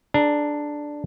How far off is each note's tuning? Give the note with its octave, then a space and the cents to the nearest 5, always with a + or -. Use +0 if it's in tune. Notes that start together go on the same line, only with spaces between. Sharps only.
D4 +5 G#4 +40 A#5 +5